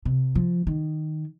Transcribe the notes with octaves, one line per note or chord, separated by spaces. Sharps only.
C3
F3
D#3